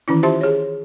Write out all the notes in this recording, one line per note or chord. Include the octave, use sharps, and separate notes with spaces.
D#3 E3 C#4 E4
F4 G4 C5 E5 A5 C6
G#4 C#5